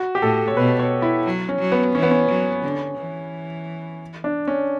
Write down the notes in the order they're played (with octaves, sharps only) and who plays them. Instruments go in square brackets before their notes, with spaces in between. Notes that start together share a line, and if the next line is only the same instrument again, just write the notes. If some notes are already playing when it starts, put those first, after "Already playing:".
Already playing: [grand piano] F#4
G4
[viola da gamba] A2 [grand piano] A4
[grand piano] C#5
[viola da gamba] B2 [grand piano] B4
[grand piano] C#5
E4
[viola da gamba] F#3
[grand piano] C#4
[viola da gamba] F#3
[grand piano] B3
[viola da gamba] E3 [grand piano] C#4
[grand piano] B3
C#4
[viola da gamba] F#3
D3
E3
[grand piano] D4
C#4